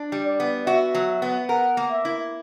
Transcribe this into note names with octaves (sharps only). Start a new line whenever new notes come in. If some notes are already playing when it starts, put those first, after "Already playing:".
Already playing: D4
G3
D5
B3
F#4 E5
F#3
B3
A#4 F#5
A#3
E5
E4